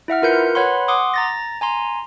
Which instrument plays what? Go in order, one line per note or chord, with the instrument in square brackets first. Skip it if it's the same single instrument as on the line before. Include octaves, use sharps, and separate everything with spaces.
[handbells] E4 E5 F#5 F6
F4 A#4 B4 G6 C#7
B4 C#5 F#5 B5 C6
F#5 C6 D6 D#6
A#5 A6 A#6
G#5 A#5 C6